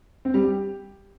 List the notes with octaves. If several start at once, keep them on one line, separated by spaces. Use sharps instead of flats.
C4
G3
G4